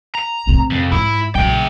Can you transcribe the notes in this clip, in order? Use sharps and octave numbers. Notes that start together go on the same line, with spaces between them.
A#5
A2 C3
F2
G#2 E4
A#1 C#3 F#3 G5